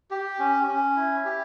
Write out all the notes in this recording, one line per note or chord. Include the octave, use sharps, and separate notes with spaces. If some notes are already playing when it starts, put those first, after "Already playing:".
G4
C#4
C#4
E4
G4